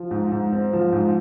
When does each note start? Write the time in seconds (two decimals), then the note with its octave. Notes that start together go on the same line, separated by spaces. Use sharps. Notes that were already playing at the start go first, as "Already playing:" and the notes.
Already playing: F3
0.11 G#2
0.32 G#2
0.52 C4
0.73 F3
0.92 G#2